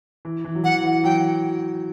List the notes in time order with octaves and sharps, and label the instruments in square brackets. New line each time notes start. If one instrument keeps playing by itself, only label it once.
[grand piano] E3
E3
F#3
[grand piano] E3 [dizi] F#5
[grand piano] E3
[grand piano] F#3 [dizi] G5